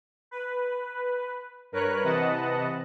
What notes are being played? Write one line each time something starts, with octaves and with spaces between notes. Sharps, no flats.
B4
G2 A#4 B4 C#5 F#6
C3 E3 B4 D#5 F#5 A5